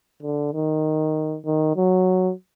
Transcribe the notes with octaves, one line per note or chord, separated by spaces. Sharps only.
D3
D#3
D#3
F#3